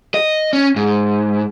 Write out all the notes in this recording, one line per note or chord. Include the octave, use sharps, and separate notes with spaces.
D#5
C#4
G#2